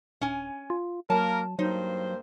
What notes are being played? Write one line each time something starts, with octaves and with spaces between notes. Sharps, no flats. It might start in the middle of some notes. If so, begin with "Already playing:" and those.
D#1 C#4 G#5
F4
F#3 A#3 A#4 A5
G2 F#3 A#3 D#4 C5